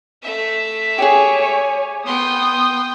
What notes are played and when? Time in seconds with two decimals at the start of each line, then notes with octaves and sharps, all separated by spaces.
0.22 A3 E5
0.98 G4 G#4 C#5 G#5
2.06 B3 G5 C6 D#6